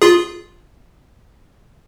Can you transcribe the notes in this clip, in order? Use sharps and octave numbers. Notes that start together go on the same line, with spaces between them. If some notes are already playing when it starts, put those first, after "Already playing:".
F4 G#4